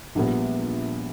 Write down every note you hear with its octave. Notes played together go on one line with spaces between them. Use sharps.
A#1 A#2 G3 B3